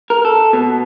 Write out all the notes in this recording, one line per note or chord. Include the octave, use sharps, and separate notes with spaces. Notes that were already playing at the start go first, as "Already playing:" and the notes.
A#4
A4
B2